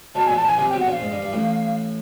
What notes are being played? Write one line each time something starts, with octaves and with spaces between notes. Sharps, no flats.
B1 B2 A5
A#1 A#2 G#5
A5
A#1 A#2 G#5
C2 C3 G#5
B1 B2 G5
F#5
A#1 A#2 F5
G#2
G2
G2
A1 A2